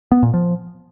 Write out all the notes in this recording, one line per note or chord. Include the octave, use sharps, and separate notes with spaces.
B3
A#2
F3